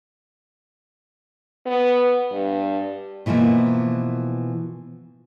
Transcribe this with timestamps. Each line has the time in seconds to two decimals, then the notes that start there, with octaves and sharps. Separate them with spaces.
1.67 B3
2.32 G2
3.26 B2 E3 F3 G3 A#3